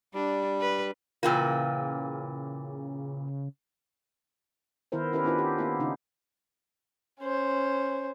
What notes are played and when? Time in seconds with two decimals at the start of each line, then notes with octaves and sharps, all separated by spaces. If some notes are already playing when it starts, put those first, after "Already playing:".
0.14 G3 D4
0.61 B4
1.23 A#2 C#3 E3 A#3 F4 G5 E6
4.92 D#3 B3 E4 A#4 C5
5.13 C#4 E4 G4 A#4 B4
5.24 B3 D4 E4 F4 B4
5.38 G4
5.58 A#3 B3 E4
5.80 C#3 C#4 D#4
7.21 C#4 C5